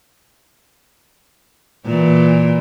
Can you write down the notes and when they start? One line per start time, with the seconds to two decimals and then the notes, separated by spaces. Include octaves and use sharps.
1.86 A#2 E3